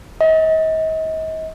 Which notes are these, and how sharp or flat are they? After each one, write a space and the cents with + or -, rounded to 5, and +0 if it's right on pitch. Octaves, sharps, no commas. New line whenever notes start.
D#5 +40